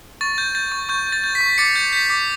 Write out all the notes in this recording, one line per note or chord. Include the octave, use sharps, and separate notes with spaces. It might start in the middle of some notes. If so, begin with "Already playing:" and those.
C#6 A6
G6
G6 A6
C#6
C#6 G6
G6
A6
G6
B6
C#6
D6 A6 C#7
G6
G6 B6
D6